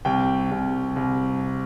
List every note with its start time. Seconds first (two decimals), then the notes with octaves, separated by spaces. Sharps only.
0.05 C2 G5
0.51 C2
0.96 C2